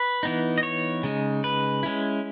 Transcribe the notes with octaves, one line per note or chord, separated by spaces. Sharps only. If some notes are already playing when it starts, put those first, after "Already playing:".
Already playing: B4
E3 B3 D#4
D#5
C#5
C#3 G#3 D#4
B4
G#3 C#4 E4